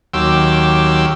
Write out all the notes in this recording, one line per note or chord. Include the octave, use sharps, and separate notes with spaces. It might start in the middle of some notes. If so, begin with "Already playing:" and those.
D#2 F#3 G4 C6 D6 E6